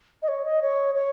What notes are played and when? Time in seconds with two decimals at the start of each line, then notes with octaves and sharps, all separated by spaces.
0.22 D#5
0.28 C#5
0.45 D#5
0.62 C#5
0.95 C#5